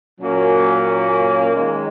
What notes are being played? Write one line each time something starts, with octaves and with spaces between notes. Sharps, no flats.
A#2 F#3 A#3 C#4
D#3 G#3 C#4